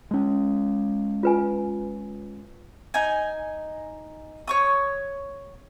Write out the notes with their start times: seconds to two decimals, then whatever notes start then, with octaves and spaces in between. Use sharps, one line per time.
0.11 G#3 C#4
1.23 F4 B4 G#5
2.94 D#4 G#5
4.47 C#5 C#6 D#6